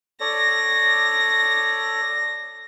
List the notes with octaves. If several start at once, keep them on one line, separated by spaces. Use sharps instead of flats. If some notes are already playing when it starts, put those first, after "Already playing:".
A4 C#5 D5 A#6